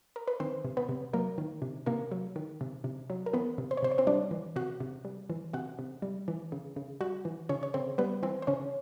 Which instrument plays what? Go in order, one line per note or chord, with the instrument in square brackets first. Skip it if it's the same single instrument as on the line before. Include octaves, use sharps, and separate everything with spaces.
[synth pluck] A#4
B4
D#3 C4 C5
C3
B3 B4
C3
F#3 A#3 A#4
D#3
C3
C3 A#3 A#4
F#3
D#3
C3
C3
F#3
A#4
E3 B3 B4
C3
C5
C#5
C3 C5
C#5
C4 C5
G3 D4 D5
E3
C3 F#4 F#5
C3
G3
E3
C3 F#4 F#5
C3
G3
E3
C#3
C#3
G3 F#4 F#5
E3
C#3 C#4 C#5
C#5
C#3 C4 C5
G3 B3 B4
E3 C4 C5
C5
C#3 C#4 C#5